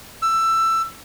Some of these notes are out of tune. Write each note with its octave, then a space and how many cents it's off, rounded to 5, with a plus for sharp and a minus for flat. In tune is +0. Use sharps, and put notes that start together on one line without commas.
E6 +15